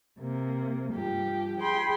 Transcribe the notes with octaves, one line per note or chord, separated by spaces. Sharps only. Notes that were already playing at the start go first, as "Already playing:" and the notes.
C3 A#3
G2 F3 G4
G#4 G5 B5 C6